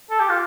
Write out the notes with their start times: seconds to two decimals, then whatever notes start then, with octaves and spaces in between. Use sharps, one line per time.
0.10 A4
0.20 G4
0.29 F4